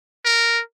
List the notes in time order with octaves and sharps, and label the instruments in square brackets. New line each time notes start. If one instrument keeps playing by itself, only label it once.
[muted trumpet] A#4